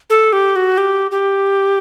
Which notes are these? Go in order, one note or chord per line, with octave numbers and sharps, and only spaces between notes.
A4
G4
F#4
G4
G4